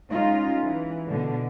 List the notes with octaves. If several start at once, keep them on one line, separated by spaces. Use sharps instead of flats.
G#3 C#4 D#4 F4
E3
B2 D3